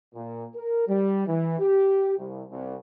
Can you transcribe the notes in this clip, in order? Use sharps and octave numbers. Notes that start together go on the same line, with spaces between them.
A#2
A#4
G3
E3
G4
C2
C2